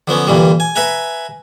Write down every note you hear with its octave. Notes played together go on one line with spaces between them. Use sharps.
D3 F3 B3 C#4
G2 A#2 D3 E3 G3
G#5
B4 E5 F#5 G#5 A#5